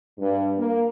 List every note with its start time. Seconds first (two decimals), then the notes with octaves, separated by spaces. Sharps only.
0.19 G2
0.57 A#3